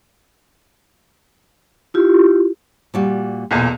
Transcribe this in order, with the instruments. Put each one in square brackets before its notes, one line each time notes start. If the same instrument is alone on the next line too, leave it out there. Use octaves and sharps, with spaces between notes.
[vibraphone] E4 F4 G4
[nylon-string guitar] A#2 G3 F#4
[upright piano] B1 E2 A#2